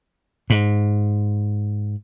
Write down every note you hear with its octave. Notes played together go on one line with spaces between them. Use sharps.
G#2